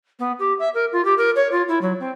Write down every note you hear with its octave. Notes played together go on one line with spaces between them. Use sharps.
B3
G4
E5
A#4
F4
G4
A#4
C#5
F4
E4
F#3
C4